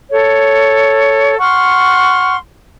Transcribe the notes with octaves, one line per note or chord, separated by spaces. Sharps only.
A4 C#5
F#5 C6 C#6 F6